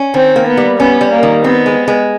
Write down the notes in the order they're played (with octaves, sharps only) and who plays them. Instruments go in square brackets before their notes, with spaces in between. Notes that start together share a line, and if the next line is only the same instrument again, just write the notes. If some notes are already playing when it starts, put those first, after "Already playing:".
Already playing: [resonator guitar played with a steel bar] C#4
[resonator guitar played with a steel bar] D#3 [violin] C4
[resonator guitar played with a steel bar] A#3
[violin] B3
[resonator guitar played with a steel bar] G3
[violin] B3 [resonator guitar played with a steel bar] C#4
[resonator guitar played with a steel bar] G3
[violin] A#3
[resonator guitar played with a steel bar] D#3
[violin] B3 [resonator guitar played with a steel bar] C4
[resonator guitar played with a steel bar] G#3
G#3